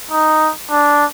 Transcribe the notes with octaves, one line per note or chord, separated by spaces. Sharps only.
D#4
D4